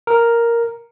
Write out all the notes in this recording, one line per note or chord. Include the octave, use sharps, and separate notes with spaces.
A#4